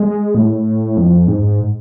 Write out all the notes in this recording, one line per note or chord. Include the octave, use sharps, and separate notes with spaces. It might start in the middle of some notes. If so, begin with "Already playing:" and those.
Already playing: G#3
A2
F2
G#2